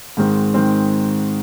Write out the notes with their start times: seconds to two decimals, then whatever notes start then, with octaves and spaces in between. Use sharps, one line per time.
0.17 G#2 D#3 G#3 C4
0.54 D#3 G#3 C4